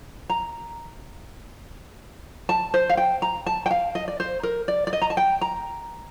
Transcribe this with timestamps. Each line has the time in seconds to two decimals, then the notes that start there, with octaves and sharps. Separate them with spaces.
0.30 A#5
2.49 A5
2.74 C5
2.89 F5
2.97 G5
3.22 A#5
3.46 A5
3.66 G5
3.71 F5
3.95 D#5
4.08 D5
4.20 C5
4.43 A#4
4.68 D5
4.87 D5
4.93 D#5
5.02 A#5
5.10 A5
5.17 G5
5.41 A#5